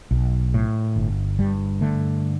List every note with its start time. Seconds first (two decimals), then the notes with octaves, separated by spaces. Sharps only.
0.11 B1
0.54 A2
0.96 G1
1.39 G2 G3
1.81 D3 A3